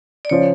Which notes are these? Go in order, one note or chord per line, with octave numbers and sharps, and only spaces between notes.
D5
C#3 F3 C#5